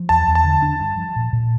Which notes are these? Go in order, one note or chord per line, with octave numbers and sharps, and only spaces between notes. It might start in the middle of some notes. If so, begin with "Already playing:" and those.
Already playing: F3
E2 A5
E2
A5
D3
D4
G2
F3
A#2
A#2